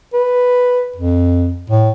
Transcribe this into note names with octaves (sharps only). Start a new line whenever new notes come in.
B4
F2
A2